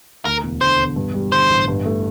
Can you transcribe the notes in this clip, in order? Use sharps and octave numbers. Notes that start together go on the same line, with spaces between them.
D2 A#4
E1
D3 C5
E1
G2
G3
D3 C5
A1
G2
A3